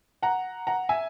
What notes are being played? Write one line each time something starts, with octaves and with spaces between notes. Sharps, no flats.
F#5 A#5
F#5 A#5
E5 G#5